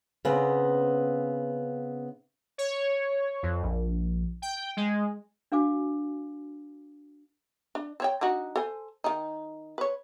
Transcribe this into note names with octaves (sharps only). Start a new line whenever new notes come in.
C#3 B3 C4
C#5
F2
A#1
G5
G#3
D4 F#4 F5 G#5 D6
D4
C4 C#5 G5
D4 D#4 F#4
A4 C5 G#5
D#3 D#4
B4 C#5